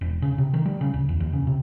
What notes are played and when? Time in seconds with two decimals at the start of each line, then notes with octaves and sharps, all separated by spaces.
0.01 E1
0.22 C#3
0.38 C3
0.54 D#3
0.66 G3
0.81 C#3
0.94 D1
1.09 E2
1.20 D#2
1.33 C#3
1.47 C3